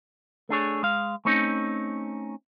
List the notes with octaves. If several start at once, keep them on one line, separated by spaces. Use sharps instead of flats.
A3 D4 G#4 C#5
G#3 F5
A3 C4 C#4 D#4